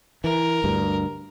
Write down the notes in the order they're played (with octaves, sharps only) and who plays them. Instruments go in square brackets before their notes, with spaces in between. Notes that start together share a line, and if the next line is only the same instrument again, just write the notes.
[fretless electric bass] E3 [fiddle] A#4
[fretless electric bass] D2 G2